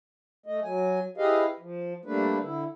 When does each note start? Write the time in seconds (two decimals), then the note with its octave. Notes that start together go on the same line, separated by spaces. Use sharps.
0.46 A3 D#5
0.63 F#3 G#5
1.17 E4 G4 G#4 B4 D#5 F5
1.60 F3
2.05 G3 A3 A#3 D4 B4
2.41 D3 E4